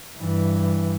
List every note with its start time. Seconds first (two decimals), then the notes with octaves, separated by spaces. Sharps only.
0.19 G2 E3